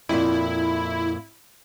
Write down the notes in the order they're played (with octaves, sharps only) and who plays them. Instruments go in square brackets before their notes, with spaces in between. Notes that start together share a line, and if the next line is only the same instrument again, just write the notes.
[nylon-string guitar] F2 A#2 [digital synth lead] E4